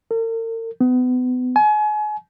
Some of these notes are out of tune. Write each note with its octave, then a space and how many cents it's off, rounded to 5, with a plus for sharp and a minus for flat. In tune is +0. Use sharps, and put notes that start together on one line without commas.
A#4 -45
B3 +30
G#5 +35